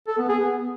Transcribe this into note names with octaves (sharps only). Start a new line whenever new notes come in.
A4
B3
G#4
B3